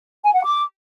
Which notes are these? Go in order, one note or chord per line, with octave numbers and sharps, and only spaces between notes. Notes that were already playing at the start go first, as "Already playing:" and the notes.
G#5
F#5
D6